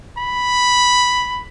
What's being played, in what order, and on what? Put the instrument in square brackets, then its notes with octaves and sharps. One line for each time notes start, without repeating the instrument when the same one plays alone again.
[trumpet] B5